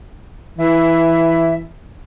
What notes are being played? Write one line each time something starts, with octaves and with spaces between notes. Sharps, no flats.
E3 E5